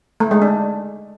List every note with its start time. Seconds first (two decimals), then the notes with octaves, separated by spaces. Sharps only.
0.20 A3
0.31 G#3
0.42 D4